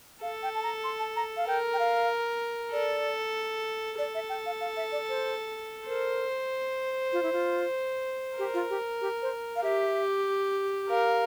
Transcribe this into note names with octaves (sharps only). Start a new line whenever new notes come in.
A4 F5
G5
A5
A#5
C6
A5
A#5
F5
A#4 G5
G5
F5
A4 D5
A4 D5
E5
G5
F5
F5
E5
D5
C5
A#4 C5
F4
E4
F4
G4 A#4
F4
G4
G4
C5
F5
G4 E5
A#4 F5